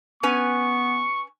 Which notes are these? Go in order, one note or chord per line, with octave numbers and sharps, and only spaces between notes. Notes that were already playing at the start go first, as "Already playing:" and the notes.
B3 C#4 B4 G#5 C#6